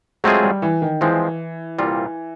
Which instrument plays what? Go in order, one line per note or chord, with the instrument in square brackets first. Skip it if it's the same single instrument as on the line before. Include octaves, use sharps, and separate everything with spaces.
[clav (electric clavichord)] F#3 A3 C4 F4 G#4 [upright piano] G#3
[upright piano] G3
E3
D#3
[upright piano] E3 [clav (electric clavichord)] F3 G#3 C4
[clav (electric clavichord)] C2 A#2 G3 C4 F4